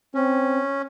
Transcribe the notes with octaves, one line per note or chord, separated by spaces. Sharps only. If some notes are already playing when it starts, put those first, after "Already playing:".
C4 C#4